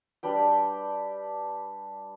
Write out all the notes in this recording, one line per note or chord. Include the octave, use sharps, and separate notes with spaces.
G3 D4 B4 G5